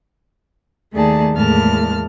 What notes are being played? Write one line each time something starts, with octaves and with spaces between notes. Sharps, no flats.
D#2 D#3 A3 G#4 D5 A5
E2 A2 G#3 A#3 A5 F6